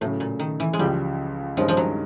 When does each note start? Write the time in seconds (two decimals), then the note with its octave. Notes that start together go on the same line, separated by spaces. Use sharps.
0.01 A2 C#3 F#3 A3
0.20 A#2
0.39 D#3
0.60 E3
0.73 G#3
0.79 C#2 C#3 F3 G3
1.57 G2 D#3 F3 G#3 C#4
1.68 F3
1.77 F#3